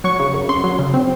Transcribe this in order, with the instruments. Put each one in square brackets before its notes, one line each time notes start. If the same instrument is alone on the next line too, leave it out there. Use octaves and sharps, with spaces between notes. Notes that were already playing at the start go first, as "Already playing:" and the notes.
[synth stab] F#3 C#6
C#3
F#2
F#2 C6
F#3
C#3
C4